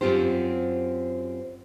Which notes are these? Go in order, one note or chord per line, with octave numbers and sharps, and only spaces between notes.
F#2 D3 C4 F4 G4 C5